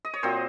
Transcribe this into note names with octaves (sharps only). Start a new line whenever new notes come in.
D#5
C#5
A#2 F#3 C4 C5